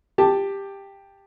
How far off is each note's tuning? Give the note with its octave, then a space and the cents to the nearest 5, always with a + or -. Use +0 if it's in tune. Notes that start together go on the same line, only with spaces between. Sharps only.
G4 +10 A5 +0